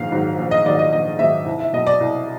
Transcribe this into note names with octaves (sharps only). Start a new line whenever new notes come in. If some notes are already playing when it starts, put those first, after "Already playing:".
Already playing: A#1 G#2 D#3 F#3 F5
G#2 D#3 F#3
A#1
D#5
G#2 D#3 F#3 D5
D#5
A#1 D#5
G#2 D#3 F#3 E5
C2
E5
B2 F#3 D#5
D5
C2